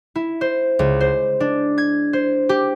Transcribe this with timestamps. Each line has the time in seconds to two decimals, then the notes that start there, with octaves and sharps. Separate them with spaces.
0.15 E4
0.41 C5
0.79 C#2
1.01 C5
1.40 D4
1.78 G#6
2.13 C5
2.49 G4